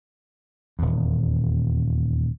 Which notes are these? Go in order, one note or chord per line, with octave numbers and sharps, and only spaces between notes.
D#1 E2